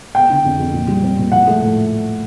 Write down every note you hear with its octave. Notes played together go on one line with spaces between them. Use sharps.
B3 G5
D3
F2
F2
A#2
G3
C4
A#2
F3 F#5
A3
A2